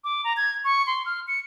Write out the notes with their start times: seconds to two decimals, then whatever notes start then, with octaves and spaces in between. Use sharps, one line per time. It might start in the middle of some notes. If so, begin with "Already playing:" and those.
0.04 D6
0.24 A#5
0.37 G#6
0.64 C#6
0.87 C6
1.06 F6
1.28 C#7